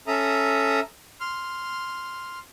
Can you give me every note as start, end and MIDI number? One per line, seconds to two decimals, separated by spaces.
0.07 0.80 61
0.07 0.80 69
0.07 0.80 76
0.07 0.80 82
0.07 0.80 87
1.21 2.39 84
1.21 2.39 89